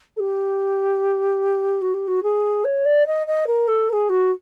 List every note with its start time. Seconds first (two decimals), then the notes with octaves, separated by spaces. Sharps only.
0.16 A4
0.20 G4
1.81 F#4
1.94 G4
2.07 F#4
2.23 G#4
2.64 C#5
2.85 D5
3.06 D#5
3.27 D#5
3.47 A#4
3.68 A4
3.89 A#4
3.93 G#4
4.09 F#4